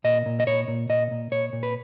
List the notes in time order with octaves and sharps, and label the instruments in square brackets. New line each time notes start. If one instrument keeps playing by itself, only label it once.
[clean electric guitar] A#2 D#5
A#2
D#5
A#2 C#5
A#2
A#2 D#5
A#2
A#2 C#5
A#2
B4